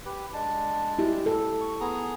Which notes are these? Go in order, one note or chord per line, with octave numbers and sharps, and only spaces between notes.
G4 B4
G#3 D4 A5
E4 G4
A4
C#6
B3 G#4 A#5